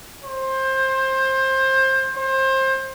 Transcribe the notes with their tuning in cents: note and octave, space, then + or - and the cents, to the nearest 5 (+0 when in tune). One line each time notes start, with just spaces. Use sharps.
C5 +20
C5 +25